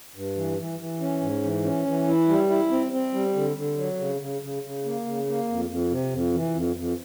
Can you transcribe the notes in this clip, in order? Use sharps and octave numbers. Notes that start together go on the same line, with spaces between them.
G2
E3
E3
E3
C#4
G#2
E3
C#4
E3
E4
G3
E4
C4
C4
G3
D3
D3
F#3
C#3
C#3
C#3
C#3
A#3
C#3
A#3
F2
F2
C3
F2
E3
F2
F2